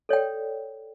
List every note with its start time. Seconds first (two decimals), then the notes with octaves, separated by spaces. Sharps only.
0.09 A4 C#5 D5 G5